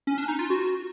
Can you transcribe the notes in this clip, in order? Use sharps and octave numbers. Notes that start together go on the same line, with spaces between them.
C#4
D4
D#4
F4
F#4